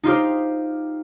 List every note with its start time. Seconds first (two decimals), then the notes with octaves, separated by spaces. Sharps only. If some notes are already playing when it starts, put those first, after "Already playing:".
0.03 D#4 F4 G4 C5